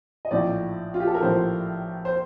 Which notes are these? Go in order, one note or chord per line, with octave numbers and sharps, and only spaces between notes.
D#5
A#1 A2 F3 D5
F4
G4
A4
A#4
A#1 A2 F3 C5
C5